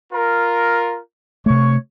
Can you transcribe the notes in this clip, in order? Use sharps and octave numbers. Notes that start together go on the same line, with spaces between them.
F4 A#4
C3 A3 C#5 C#6